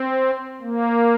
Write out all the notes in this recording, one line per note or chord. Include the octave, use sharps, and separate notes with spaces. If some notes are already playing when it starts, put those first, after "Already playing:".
Already playing: C4
A#3